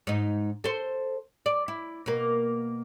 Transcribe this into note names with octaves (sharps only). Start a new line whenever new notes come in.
G#2 D#4
A4 C5
D5
E4
B2 A#3